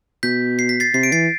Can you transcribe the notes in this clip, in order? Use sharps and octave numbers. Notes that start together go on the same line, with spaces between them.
B2 G6 B6
C7
B6
A6 C7
C3 C7
D7
E3 A6 C7